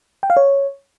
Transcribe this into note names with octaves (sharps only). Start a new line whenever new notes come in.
G5
F5
C#5